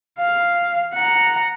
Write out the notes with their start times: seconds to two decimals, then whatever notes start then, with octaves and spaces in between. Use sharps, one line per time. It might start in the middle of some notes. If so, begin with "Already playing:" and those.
0.19 F5
0.93 F#5 A#5